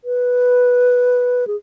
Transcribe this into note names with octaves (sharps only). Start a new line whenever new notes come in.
B4
G#4